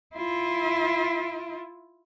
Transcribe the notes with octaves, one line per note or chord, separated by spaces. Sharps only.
E4 F4